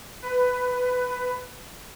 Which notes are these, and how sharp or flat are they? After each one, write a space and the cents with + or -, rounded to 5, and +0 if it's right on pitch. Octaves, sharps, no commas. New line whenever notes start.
B4 +15